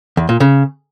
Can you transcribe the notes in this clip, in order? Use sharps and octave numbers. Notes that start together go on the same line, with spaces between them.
E2
A#2
C#3